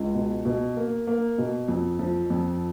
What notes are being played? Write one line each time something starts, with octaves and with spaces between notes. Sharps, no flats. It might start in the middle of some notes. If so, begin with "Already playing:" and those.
Already playing: C#2 G#3
B2
B2
A#3
A#3
B2
F2
F3
F2